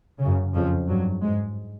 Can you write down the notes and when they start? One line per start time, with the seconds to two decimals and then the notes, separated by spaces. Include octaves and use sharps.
0.20 F#2 C#3
0.54 F2 C#3 F3
0.88 G2 F#3
1.22 G#2 G#3